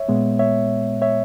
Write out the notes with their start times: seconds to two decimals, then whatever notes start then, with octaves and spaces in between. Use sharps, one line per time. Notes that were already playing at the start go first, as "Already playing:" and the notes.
Already playing: C#5 E5
0.08 A#2 G#3 B3
0.39 C#5 E5
1.02 C#5 E5